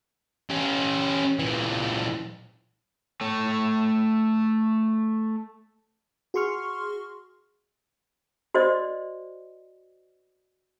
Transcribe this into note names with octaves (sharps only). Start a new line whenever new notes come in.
C#4 G4
A#2 E3
A3 C#5
F#4 G#4 C6 C#6 F6
F#4 C5 D5 D#5